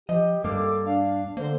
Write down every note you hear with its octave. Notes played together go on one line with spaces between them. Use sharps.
F3 G4 D#5
G2 G3 A#3 A4 D6
D4 F5
D3 A#3 C5